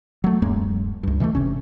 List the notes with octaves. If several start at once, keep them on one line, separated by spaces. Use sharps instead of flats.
F#3 A3
D1 F#2 G#3 A#3
C#2 G2
B2 E3 F3 A3
G1 C3 C#4